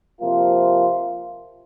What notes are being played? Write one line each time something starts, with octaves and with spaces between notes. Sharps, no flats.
C3 F3 A#3 F4